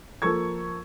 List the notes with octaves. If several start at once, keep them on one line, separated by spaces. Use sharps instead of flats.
F3 A#3 A4 C#6 G#6